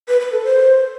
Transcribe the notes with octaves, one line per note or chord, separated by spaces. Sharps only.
B4
B4
A4
C5